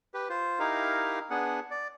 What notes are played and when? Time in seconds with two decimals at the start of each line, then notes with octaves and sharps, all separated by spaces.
0.14 G4 B4
0.29 F4 C5
0.59 D#4 E4 G4 A#4 F5
1.30 B3 D4 G#4 F#5
1.71 D5